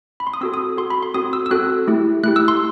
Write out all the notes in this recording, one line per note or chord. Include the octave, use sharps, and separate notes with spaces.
B5
C6
D#6
C4 F#4 A4 E6
D#6
C4 F#4 A4 C6
B5
C6
C4 F#4 A4 D#6
E6
E6
C4 F#4 A4 F#6
A3 E4 G4
A3 E4 G4 F#6
E6
C6